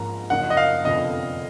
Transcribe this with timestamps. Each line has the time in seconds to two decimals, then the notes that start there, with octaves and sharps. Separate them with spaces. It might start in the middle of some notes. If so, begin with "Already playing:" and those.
Already playing: G#2 F3 A#3 A#5
0.30 F#1 F#2 F3 A#3 D#4 F#5
0.50 D#5
0.57 F5
0.85 F1 F2 D3 F3 B3 D#5